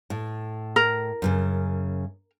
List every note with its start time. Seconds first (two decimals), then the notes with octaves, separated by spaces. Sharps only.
0.10 A2
0.76 A#4
1.22 F#2 A#2 C#3